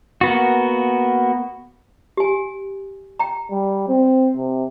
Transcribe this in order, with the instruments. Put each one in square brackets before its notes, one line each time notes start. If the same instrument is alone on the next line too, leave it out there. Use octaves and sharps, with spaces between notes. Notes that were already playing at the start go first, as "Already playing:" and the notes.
[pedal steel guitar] A#3 B3 F#4
[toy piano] G4 G#5
G5 A#5
[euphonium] G3
C4
C3